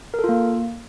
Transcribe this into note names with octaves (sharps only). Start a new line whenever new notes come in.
A#4
A4
F4
A#3